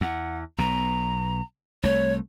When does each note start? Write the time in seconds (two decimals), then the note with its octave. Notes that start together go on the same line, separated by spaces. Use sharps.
0.01 E2 F#5
0.58 B1 B2 A#5
1.83 C2 A3 C#5